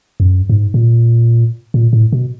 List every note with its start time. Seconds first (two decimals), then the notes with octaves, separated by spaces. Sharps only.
0.20 F2
0.24 F#2
0.50 G#2
0.74 A#2
1.74 A#2
1.93 A2
2.13 B2